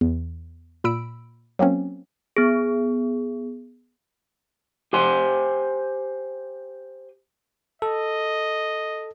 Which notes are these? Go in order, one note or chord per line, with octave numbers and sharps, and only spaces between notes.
E2
A#2 B5 E6 D7
F#3 A#3 C4 C#4
B3 G#4
G4 C5 G#5 C6
A4 D#5